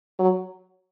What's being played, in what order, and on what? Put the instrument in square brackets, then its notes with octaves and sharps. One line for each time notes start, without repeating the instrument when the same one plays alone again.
[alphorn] F#3